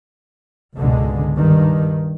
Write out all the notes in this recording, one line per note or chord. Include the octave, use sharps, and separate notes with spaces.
G#1 C#2 B2 D3 G#3
G2 D#3